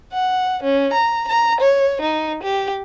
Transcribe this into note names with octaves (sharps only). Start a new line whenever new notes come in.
F#5
C#4
A#5
A#5
C#5
D#4
G4